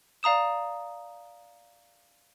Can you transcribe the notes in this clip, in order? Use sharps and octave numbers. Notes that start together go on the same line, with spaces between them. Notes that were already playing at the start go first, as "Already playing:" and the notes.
D5 F5 A#5 D#6 E7